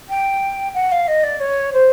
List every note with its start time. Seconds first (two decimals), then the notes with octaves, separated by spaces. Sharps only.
0.09 G5
0.74 F#5
0.92 F5
1.08 D#5
1.23 D5
1.40 C#5
1.73 C5